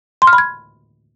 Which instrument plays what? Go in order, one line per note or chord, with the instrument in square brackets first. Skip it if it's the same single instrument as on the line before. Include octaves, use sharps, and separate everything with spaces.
[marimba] C6
F6
B5
G#6